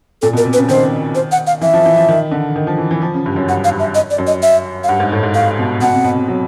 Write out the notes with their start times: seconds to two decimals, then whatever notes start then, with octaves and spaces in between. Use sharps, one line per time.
0.22 A#2 A4
0.33 B2 A#4
0.45 C3
0.53 B4
0.57 C#3
0.68 D#3 C5
1.15 C5
1.31 F#5
1.47 F5
1.61 E3 E5
1.74 F3
1.86 E3
1.97 F3
2.09 D#3
2.31 D3
2.56 D#3
2.67 F3
2.78 E3
2.91 E3
3.02 F3
3.14 C#3
3.26 G2
3.36 F#2
3.48 G2 F#5
3.64 F5
3.71 G2
3.79 E5
3.95 D#5
4.10 D5
4.18 F#2
4.27 D#5
4.42 E5
4.84 F5
4.89 G2 F#5
5.00 G#2
5.12 A2
5.23 G#2
5.35 A2 F5
5.59 B2
5.81 B2 F#5
5.93 C3
6.04 B2
6.16 C3
6.28 F#3